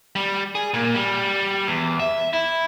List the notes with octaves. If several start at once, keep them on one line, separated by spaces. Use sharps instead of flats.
G3
G#4
A#2
G3
E2
E5
E4